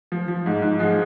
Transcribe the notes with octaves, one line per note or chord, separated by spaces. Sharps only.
F3
F3
G#2
G#2
F3 G#3